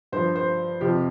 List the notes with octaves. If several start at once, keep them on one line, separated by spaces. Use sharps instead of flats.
G2 F3 C5
C5
F2 C3 F3 G4